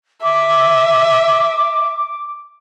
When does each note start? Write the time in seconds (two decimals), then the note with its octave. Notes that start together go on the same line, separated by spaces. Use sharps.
0.23 E5 D6